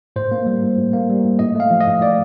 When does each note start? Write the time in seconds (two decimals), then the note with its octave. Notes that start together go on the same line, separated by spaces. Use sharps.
0.16 A2 C5
0.32 A#3
0.46 G3
0.63 A2
0.78 A2
0.93 A#3
1.09 G3
1.24 A2
1.39 A2 D#5
1.55 A3 F5
1.71 F3
1.81 D#5
1.87 A2
2.01 A2 D5